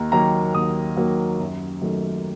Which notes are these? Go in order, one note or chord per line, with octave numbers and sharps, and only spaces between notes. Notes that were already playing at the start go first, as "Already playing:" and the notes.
Already playing: D#2 A#5
D#3 F#3 A#3 A#5
D#2 D#6
D#3 F#3 A#3
F#2
D#3 F#3 A3